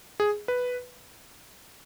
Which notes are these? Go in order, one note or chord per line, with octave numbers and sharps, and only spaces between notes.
G#4
B4